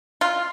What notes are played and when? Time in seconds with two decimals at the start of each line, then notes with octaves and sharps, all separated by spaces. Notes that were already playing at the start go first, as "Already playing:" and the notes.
0.21 F4